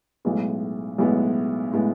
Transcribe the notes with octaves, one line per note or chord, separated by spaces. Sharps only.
B1 A2 G#3 B3
B1 A2 G#3 B3
A2 G#3 B3